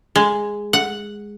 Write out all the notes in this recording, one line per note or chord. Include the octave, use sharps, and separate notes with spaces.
G#3
F#5